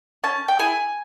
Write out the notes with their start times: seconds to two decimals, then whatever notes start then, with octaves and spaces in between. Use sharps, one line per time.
0.24 C#4 A5
0.48 G5
0.59 E4 G#4 G#5